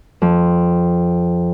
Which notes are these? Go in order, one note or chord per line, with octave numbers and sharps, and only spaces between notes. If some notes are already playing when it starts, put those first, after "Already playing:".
F2